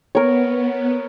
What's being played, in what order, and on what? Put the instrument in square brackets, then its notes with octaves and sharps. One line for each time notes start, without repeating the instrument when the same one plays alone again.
[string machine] B3 [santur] A#4 C#5